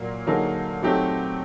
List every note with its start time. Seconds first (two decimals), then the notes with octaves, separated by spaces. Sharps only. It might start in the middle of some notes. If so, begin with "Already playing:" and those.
Already playing: A#2 F#3 A#3
0.27 D3 F#3 A#3 D#4 G#4
0.83 F#3 A3 C4 D#4 G4